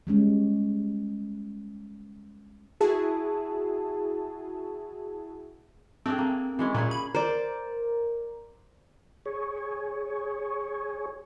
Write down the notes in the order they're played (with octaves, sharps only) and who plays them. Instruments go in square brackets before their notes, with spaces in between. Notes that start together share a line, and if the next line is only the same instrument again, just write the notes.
[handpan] G3 G#3 C#4
[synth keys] E4 F#4 G#4 A5
[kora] A3 D4 G#4 [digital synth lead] C4
[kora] A#3
E3 G#3 C#4
[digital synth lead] A#2 [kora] A#3 C#4 G#4
[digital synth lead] B5
[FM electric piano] A#4 [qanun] C5 D5
[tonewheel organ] G#4 C#5